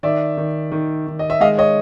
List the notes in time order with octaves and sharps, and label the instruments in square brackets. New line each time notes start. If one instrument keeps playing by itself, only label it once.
[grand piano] D#3 D5 E5
D#3
D#3
D#3
D#5
E5
G#3 D#5 F5
C#5 D#5